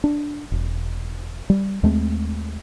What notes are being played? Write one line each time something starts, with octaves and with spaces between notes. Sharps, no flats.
D4
E1
G3
D#2 G#3 A3 C4